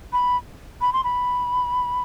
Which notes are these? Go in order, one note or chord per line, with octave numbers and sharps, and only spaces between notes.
B5
B5
C6
B5